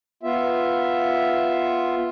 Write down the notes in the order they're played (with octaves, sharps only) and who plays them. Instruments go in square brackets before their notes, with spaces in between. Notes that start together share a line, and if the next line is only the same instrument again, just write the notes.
[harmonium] B3 F4 E5